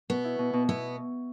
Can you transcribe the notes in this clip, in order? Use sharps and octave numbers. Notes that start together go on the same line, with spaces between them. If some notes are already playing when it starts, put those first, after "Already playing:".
B2 B3
E4
B2
B2
B3 E4